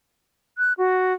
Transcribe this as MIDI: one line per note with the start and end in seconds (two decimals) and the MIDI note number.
0.58 0.73 90
0.78 1.14 66